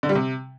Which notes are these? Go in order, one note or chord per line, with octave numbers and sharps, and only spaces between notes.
D3
G3
C3